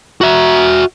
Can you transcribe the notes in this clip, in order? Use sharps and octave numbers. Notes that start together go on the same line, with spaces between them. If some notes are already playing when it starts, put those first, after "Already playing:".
F#4 E5